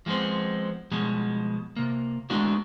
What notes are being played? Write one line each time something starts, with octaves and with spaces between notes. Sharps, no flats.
F3 G#3 A3 B3 C4
B2 F3 G3 G#3
C3 A#3
G#3 A3 B3 D4 D#4 F#4